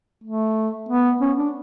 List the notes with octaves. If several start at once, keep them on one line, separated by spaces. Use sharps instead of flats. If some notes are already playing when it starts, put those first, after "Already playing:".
A3
B3
C#4
D4